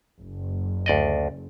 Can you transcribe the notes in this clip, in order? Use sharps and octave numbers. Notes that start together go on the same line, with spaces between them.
F#1
D2 D5 D#5